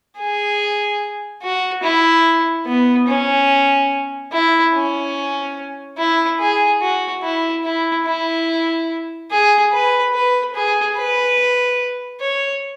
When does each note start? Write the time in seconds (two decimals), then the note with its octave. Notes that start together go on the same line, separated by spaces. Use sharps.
0.18 G#4
1.42 F#4
1.83 E4
2.67 B3
3.07 C#4
4.33 E4
4.74 C#4
5.98 E4
6.39 G#4
6.81 F#4
7.23 E4
7.65 E4
8.06 E4
9.31 G#4
9.72 B4
10.14 B4
10.54 G#4
10.96 B4
12.21 C#5